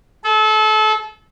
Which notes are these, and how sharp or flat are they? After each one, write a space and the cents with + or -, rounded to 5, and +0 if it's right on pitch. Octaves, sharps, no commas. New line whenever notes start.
A4 -30